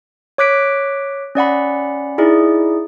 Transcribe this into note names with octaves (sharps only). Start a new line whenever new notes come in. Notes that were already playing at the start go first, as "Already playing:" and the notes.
C#5 D6 F#6 B6 D7
C#4 D5 F#5 B5
D#4 E4 G#4 D5